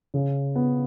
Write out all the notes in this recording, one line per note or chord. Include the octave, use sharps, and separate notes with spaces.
C#3
B3